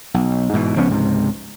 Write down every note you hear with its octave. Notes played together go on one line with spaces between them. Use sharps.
B1
G#2 B2 E3
C#2 F3 B3 C#4
C#2 G#2 C3